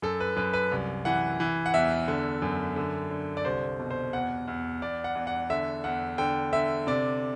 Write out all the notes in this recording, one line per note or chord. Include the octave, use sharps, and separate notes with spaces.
F#2 A4
B4
F#2 B4
B4
C2
E3 F#5
E3
F#5
E2 E5
D3
F#2
D3
D3
D5
C2 C5
B2
C5
E2 F#5
E2
E2 D5
F#5
E2
F#5
D3 E5
E2 F#5
D3 G5
D3 E5
C3 D5